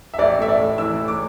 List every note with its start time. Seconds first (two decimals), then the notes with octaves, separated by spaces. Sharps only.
0.14 E5
0.18 A1 D5
0.39 A3 E5
0.48 D5
0.58 A2
0.78 E3 E6
0.99 A2
1.08 D6